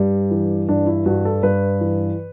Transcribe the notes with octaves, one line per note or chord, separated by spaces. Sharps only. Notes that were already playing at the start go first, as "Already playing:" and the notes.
Already playing: G2 G3
E3
G2 D4
E4
G2 F#4
A4
G2 B4
E3